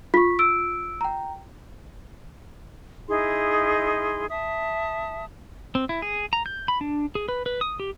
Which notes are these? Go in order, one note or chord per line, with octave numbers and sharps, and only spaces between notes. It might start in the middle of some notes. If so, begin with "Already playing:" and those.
F4 C#6 B6
E6 D7
G5 A#5
D#4 E4 G#4 C6
E5 A5 D#6
C4
E4
G#4
A#5
G6
B5
D4
G#4
B4
B4
D#6
G4